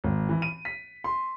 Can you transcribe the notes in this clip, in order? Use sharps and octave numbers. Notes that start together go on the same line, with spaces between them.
G#1
E3
D#7
B6
C6